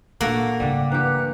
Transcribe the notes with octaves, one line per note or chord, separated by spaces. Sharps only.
A#2 A3 A#3 D4 F#4 A4 F#5
G#2 C#3 G3 D4
G2 E3 G4 F#5 A#5 F#6